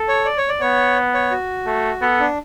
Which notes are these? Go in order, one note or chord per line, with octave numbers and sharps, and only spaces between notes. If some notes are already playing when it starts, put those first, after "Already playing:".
Already playing: A4
C#5
D5
C#5
D5
B3 C#5
C#5
F#4
A3
B3 A4
D4